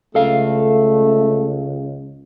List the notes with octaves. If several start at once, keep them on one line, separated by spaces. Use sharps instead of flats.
C#2 A3 A4 F5